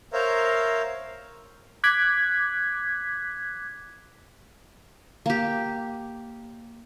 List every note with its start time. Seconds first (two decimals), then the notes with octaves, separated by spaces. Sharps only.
0.13 A#4 C5 C#5 E5 F5 A#5
1.84 D6 F#6 G#6 B6
5.26 A#3 G4